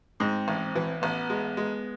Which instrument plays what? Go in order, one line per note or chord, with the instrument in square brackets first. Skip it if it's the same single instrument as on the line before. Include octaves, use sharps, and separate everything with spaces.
[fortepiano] G#2 [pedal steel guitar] C4
[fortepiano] A1
E3
[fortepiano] A1 [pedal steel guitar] B3
[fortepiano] G#3
G#3